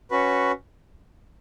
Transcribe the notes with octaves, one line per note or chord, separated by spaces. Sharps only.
C#4 F#4 B4